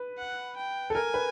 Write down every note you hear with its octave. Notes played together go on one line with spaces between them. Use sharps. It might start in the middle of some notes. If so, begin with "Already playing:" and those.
Already playing: B4
F#5
G5
A4
A#4 G#5
B4